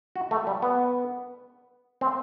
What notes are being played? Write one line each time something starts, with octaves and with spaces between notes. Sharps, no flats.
F#4
A3
G3
B3
C4